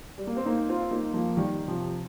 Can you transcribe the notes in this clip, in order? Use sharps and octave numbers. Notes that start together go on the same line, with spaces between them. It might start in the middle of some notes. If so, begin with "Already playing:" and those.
G3
A#3
C4
A#3 D#4
C4 F4
A#3 D#4
F3 A#3
D#3 G3
C3 F3